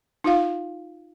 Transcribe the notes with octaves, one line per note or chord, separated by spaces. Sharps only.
D#4 F4 F5